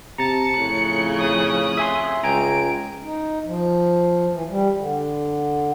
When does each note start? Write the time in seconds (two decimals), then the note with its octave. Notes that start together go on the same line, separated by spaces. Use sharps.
0.18 C3 A5 A#5 A6 C#7
0.57 F2 A2 C#3 F#6
1.19 D#6
1.77 E5 G#5 C6
2.24 C#2 G5 G#5 A#5 D7
3.03 D#4
3.45 F3
4.32 E3
4.49 G3
4.77 D3